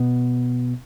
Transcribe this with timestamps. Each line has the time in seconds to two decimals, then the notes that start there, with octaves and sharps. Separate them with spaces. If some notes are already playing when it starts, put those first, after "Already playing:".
Already playing: B2 B3